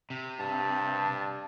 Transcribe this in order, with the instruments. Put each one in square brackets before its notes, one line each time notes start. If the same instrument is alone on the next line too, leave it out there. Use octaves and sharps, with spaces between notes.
[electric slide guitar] C3
[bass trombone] G2 [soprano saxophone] A5